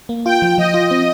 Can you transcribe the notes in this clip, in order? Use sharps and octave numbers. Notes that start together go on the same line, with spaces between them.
A#3
F4 G5
F3
F3 D#5
F4
C4